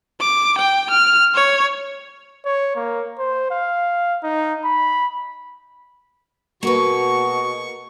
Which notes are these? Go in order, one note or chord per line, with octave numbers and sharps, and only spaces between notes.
D6
G5
F6
C#5
C#5
A#3
C5
F5
D#4
B5
B2 A#3 F#4 G#4 B4 C#6